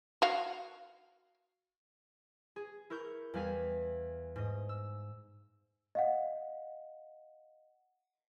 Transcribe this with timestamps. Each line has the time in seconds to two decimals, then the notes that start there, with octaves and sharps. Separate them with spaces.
0.22 F#4 F5
2.56 G#4
2.90 E4 A#4 C#6 G6
3.34 E2 G3 F5 G#5 B6
4.36 G#2 D#5
4.69 E6
5.95 D#5 F5 F#5